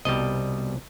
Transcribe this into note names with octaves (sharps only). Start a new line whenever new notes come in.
C2 B2 G3 D#5